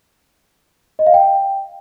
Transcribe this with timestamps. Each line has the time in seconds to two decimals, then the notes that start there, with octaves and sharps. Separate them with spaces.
0.99 D#5
1.06 F5
1.14 G5